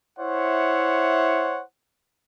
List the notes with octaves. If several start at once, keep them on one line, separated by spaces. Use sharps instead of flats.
E4 C5 C#5 E5 F#5